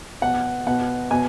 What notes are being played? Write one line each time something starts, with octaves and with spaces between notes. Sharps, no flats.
B2 F#5
B2 F#5
B2 G#5